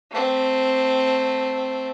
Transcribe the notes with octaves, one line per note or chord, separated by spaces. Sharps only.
A3 C4